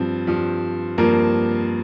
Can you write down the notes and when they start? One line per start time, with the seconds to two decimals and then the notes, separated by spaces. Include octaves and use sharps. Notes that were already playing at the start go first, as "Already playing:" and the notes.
Already playing: G2 F3 C4
0.27 G2 F3
0.98 G2 F3 A#3 A#4